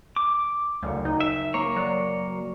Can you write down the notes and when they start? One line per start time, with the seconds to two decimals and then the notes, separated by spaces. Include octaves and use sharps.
0.16 D6
0.82 F#1 D2 C#7
1.05 D#4
1.21 E5
1.54 A#3 C#5 A#5 C#6 C7
1.76 F#3 D5